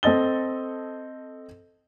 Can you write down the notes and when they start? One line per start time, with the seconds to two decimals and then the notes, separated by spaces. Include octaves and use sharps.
0.03 C4 A4 D#5 A6 G7